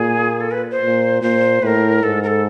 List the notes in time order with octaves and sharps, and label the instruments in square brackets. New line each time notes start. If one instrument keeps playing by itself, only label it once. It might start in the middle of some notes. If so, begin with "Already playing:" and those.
Already playing: [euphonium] A#2 [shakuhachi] G#4
[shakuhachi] A4
B4
C5
[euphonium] A#2
[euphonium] A#2 [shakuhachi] C5
[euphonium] A2 [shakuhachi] B4
[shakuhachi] A#4
[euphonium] G#2 [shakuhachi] A4
[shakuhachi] A#4
A4